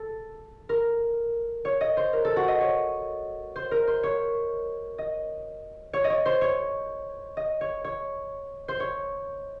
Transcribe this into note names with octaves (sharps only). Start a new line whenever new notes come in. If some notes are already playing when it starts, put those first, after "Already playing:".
Already playing: A4
A#4
C#5
D#5
C5
A#4
A4
F#4
D#5
C#5
C5
A#4
C5
C#5
D#5
C#5
D#5
C#5
C5
C#5
D#5
C#5
C#5
C5
C#5